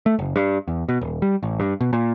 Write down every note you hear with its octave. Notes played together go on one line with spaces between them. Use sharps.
A3
F#1
G2
E2
B2
D#1
G3
A1
G2
B2
A#2